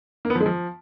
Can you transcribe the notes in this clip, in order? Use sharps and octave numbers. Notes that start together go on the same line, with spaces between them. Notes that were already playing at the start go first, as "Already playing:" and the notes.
A#3
B3
F3
G#3
F3